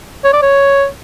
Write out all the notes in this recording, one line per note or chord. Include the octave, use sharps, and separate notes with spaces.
C#5
D5
C#5